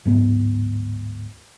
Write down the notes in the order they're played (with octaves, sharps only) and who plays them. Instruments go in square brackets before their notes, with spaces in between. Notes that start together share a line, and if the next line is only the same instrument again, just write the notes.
[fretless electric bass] D1 G#2 B3